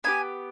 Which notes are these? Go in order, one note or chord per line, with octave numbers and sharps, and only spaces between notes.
B3 D4 G4 G#5